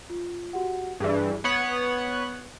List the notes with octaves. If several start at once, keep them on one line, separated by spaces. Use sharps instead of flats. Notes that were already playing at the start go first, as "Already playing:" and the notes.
F4
F#4 G4 F#5
G2 E3 G#4 D5
B3 C#5 F#5 C#6 D#6 G#6